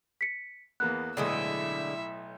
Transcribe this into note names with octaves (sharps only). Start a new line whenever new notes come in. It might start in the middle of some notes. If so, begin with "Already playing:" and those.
B6 C#7
E2 A#3 B3 F#6
B1 A2 D3 G#3 E4 D#5 E5